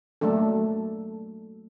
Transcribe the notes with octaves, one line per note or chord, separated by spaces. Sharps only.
F#3 A3 A#3 D4 A4